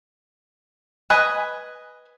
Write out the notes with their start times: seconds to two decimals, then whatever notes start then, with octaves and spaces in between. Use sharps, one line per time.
1.10 B4 D#5 G#5